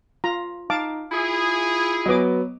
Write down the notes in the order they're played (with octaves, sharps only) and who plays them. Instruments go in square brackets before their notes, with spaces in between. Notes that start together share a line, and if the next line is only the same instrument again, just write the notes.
[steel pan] F4 A#5
[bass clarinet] D#4 [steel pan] F5 A5 D6
[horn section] E4 G#4 [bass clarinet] F4
[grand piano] F#3 B3 [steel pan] D#5 D6